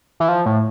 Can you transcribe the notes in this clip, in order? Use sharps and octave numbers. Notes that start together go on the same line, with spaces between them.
E3
F3
A2